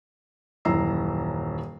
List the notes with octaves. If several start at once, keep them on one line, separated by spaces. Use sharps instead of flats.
D#1 F#2 E3 A#5 E6 C7